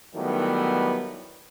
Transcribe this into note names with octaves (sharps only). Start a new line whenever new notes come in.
D#3 E3 F#3 G3 A3 B3